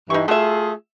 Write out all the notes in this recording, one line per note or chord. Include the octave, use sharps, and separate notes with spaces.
G2 E3 D#4 C#6
A3 F4 F#4 G#4 E5